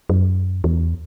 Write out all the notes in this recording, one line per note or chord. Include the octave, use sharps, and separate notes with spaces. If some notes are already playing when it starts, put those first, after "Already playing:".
F#2
E2